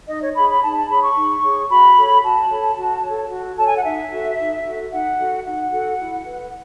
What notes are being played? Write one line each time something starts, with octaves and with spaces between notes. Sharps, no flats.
D#4 D#5
C#5
G#4 C#5 B5
B5
D#4 A5
A5
G#4 C#5 B5
C#6
D#4
G#4 C#5
F#4 B5
A4 C#5
F#4 A5
A4 C#5
F#4
A4 C#5
F#4
A4 C#5 A5
G#5
F#5
D#4 E5
F#4 A4
D#4
F#4 A4
D#4 F#5
F#4 A4
D#4 F#5
F#4 A4
E4
B4